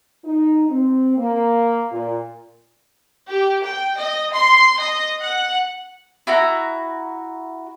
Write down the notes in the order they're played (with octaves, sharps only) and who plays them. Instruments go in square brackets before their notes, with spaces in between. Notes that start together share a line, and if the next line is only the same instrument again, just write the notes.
[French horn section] D#4
C4
A#3
A#2
[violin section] G4
G5
D#5
C6
D#5
F#5
[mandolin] E4 F#4 A#5